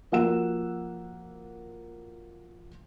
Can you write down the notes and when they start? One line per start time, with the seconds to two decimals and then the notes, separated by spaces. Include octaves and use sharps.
0.12 F3 A#3 F#4 F#5 E6 E7